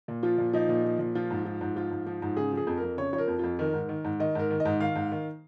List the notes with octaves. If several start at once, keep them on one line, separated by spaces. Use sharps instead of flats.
A#2
F3 F4
A#2
F3 D#4
A#2
F3
A#2
F3 F4
G#2
F3
G#2
F3 F4
G#2
F3
G#2
C#3 G#4
F3 G#4
F2
A#4
F2
C#3 C#5
F3 C#5
A#4
F2
F2 F4
D#3 A#4
G#2
D#3
G#2
D#3 D#5
G#2 A#4
D#3
D#5
G#2
D#3 F5
G#2
D#3